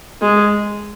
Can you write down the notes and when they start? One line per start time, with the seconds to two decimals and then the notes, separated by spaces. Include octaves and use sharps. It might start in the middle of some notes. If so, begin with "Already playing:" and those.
0.22 G#3